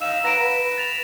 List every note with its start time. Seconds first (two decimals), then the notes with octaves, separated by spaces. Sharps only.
0.02 D#4 F5 E6 E7
0.25 B4 F#5 A#5 A#6 D7 E7
0.40 B4
0.78 A6 F7